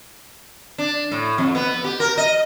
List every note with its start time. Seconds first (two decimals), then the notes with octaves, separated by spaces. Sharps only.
0.78 D4
1.11 A2
1.38 F2
1.55 B3
1.84 G4
2.00 A#4
2.18 D#5